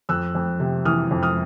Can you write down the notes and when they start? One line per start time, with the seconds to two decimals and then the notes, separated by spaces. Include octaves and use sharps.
0.09 F2 E6 F#6
0.35 F2
0.60 C3
0.85 E3 D#6 F6
1.11 F2
1.23 D#6 F6